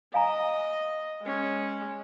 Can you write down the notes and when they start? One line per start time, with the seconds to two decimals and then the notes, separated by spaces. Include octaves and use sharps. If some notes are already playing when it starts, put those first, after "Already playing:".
0.14 D#5 F5 G#5 A#5
1.23 G#3 C#4